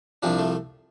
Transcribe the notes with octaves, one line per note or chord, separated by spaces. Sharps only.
C2 C3 F3 D4 G4
A3